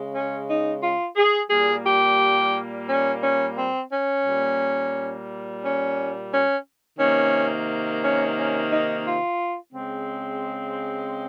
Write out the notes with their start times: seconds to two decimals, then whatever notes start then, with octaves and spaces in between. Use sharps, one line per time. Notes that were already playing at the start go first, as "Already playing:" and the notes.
Already playing: C#3 G#3
0.12 C#4
0.48 D#4
0.81 F4
1.16 G#4
1.50 A#2 G3 A#3 G#4
1.84 G4
2.87 C#4
3.21 C#4
3.56 C4
3.90 C#4
4.25 A#2 G3 A#3
5.61 C#4
6.31 C#4
6.98 C3 D#3 A#3 C#4
8.01 C#4
8.36 C#4
8.70 D#4
9.05 F4
9.73 C#3 G#3 C4